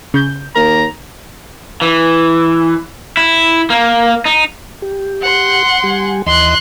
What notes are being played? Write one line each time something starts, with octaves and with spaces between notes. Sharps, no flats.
C#3 G6
D#2 A#4 A#5
E3
E4
A#3
D#4
G4
F#5 C6
G3 G4 G#5
D#2 E3 D#5 C6 F#6